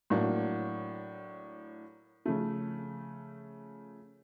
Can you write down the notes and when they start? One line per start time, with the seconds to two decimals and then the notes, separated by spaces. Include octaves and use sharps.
0.10 A2 F#3 A#3 D4 F#4
2.25 C#3 F3 A3